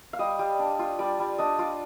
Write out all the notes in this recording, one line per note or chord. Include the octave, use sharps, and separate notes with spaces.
F5
G3 D#5
G3
D4
F4
G3 D5
G3
D4 D#5
F4 D5